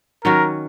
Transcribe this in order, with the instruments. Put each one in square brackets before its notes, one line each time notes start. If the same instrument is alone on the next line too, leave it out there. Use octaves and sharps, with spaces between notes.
[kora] D#3 F#3 C#4 F#4 [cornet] A#4